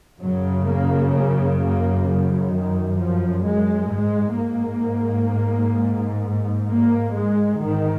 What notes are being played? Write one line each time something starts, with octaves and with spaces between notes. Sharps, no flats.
F#2 C#3 F#3
A#3
A#3
A#3
C#3
D#3
F3
G#3
G#2 G#3
A#3
A#3
G#3
G#2 D#3